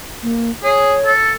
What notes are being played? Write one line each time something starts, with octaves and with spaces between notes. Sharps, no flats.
A#3
G#4 C#5
A4